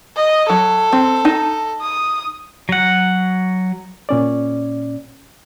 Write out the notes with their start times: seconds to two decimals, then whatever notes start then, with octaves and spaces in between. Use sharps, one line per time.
0.16 D#5
0.50 F#3 A4
0.93 C4
1.25 D#4 A5
1.81 D#6
2.69 F#3 F#5
4.09 A#2 C#4 D5